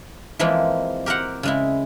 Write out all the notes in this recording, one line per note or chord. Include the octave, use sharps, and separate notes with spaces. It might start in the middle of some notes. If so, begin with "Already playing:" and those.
E3 F3 G#3 A#3 C4 E4
G4 A#4 C5 F#5
C#3 G#3 E4